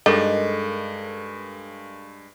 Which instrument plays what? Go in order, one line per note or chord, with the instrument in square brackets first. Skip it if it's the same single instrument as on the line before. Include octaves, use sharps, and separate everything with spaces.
[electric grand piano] G2 G#3 [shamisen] D#3 [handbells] A4 A#4 [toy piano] D#5 D6